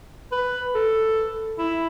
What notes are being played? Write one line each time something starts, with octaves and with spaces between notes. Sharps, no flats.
B4
A4
E4